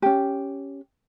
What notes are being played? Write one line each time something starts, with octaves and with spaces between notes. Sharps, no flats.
C#4 G4